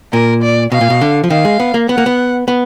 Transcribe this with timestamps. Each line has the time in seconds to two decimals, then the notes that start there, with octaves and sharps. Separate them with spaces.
0.13 A#2 A#4
0.42 D5
0.72 B2 F5
0.81 A#2
0.90 B2
1.01 D3
1.24 F3
1.30 D#3 F5
1.45 G#3
1.60 B3
1.74 A#3
1.89 B3 F#5
1.98 A#3
2.06 B3
2.48 B3